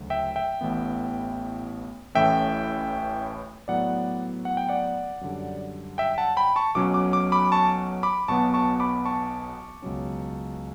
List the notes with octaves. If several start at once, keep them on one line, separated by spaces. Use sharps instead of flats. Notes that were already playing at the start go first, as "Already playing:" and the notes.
Already playing: D2 C#3 F#3
E5 G5
E5 G5
A1 A2 E3 B3
A1 A2 E3 A3 C#4 E5 G5
A2 F#3 B3 D5 F#5
F#5
G5
D5 F#5
F#2 D3 G3
E5 G5
F#5 A5
G5 B5
A5 C#6
B1 B2 F#3 C#4 D6
D6
D6
B5 D6
D6
A5 C#6
B5 D6
B1 B2 F#3 B3 A5 C#6
A5 C#6
B5 D6
A5 C#6
C#2 B2 F#3 C#4